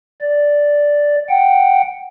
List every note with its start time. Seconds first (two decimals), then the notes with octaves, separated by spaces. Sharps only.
0.21 D5
1.29 F#5 G5